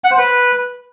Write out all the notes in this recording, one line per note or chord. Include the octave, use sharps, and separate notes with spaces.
F#5
C5
B4